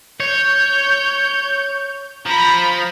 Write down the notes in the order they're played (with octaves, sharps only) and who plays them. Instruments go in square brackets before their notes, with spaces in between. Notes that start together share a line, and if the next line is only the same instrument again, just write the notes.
[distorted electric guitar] C#5 [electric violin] G6
[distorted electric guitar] F3 [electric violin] A#5 B5